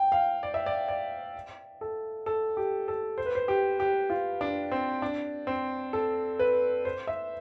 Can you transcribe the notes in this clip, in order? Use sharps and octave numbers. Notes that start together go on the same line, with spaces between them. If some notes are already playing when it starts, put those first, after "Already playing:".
Already playing: G5
F5
D5
E5
D5
D5
A4
A4
G4
A4
C5
B4
C5
G4
G4
F4
D4
C4
D4
C4
A4
B4
C5
E5